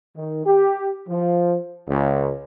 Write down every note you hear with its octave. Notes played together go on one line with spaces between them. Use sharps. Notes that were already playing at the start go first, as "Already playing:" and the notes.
D#3
G4
F3
C#2